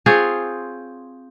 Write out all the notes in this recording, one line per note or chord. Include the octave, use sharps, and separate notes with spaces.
C4 F4 G#4 C#5